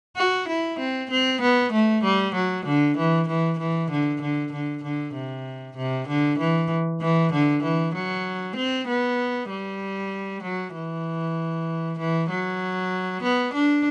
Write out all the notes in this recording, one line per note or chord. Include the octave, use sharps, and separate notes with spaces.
F#4
E4
C4
C4
B3
A3
G3
F#3
D3
E3
E3
E3
D3
D3
D3
D3
C3
C3
D3
E3
E3
D3
E3
F#3
C4
B3
G3
F#3
E3
E3
F#3
B3
D4